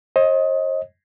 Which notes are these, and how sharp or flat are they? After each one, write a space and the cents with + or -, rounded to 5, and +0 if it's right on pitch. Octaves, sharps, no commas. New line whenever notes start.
C5 +45 D#5 +15